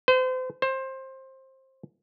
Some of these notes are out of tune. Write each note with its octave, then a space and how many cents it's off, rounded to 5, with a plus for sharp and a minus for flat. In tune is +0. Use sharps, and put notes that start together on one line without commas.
C5 -35
C5 +20